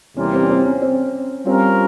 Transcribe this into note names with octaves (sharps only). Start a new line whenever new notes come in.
E2 C3 G3 A#3 C#4 F4
C4
C#4
C4
C#4
C4
G3 C4 C#4 F4 A#4